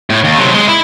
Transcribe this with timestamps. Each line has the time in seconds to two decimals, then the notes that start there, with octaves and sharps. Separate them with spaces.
0.10 A2
0.24 D#2
0.39 C3 F#3
0.54 G#3
0.68 E4